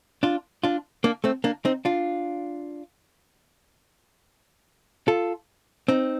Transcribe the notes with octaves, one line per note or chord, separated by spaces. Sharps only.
D4 F4
D4 F4
A#3 D4
A3 C4
A#3 D4
C4 D#4
D4 F4
F4 A4
C4 D#4